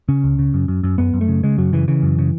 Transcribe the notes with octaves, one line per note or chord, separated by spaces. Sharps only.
C#3 C#4
C#2
C#3
F#2
F#2
F#2
F#2 B3
F#2
A3
C#3
C#3 G#3
F#2 F#3
C#3 E3
C#3 E3
F#2
C#3